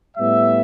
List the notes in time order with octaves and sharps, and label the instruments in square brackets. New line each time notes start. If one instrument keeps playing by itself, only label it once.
[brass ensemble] A2 G3 B3 E5